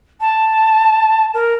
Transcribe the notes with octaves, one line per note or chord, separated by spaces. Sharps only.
A5
A#4